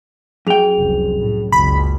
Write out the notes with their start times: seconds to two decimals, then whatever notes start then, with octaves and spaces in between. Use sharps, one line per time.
0.47 F#2 G#4 G5 F7
0.78 F1 C2
1.19 A2
1.52 F#1 C#2 B5